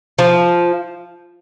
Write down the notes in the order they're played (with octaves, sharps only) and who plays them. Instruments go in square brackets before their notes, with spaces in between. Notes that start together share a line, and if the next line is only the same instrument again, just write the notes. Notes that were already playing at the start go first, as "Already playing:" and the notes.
[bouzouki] F3